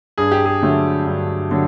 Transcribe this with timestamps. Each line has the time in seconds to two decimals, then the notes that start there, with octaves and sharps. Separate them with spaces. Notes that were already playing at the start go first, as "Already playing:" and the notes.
0.18 G2 G#4
0.32 G4
0.45 G#4
0.62 D3 F#3 A3
1.07 G2
1.51 D3 F#3